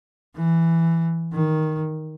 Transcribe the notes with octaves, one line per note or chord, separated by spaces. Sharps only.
E3
D#3